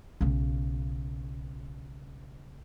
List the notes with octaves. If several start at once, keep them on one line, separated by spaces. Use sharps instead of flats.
B1 C#3